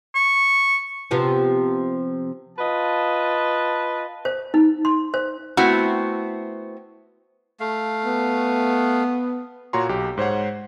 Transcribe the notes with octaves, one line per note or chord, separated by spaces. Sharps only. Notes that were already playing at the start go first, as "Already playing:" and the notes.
C#6
C3 F3 B3
F4 B4 D#5 A5
C5
D#4
C6
C5
A3 B3 C4 E4 F#4
A3 F5
B3
A#2 F#4 C#5 A#5 C6
B1 G4
G#2 C5 C#5 F#5